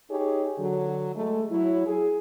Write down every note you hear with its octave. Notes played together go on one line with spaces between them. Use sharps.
D#4 G4 G#4 C#5
D3 F#3
G#3 A3
F#3 E4
G#4